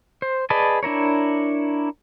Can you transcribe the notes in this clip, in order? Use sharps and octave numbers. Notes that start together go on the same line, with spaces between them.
C5
G#4 B4 D5 D#5 A5
D4 E4 A#4 C#5